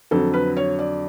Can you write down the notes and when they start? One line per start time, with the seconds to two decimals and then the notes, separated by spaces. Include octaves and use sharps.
0.11 F2 D3 F#3 A4
0.34 B4
0.57 C#5
0.79 D5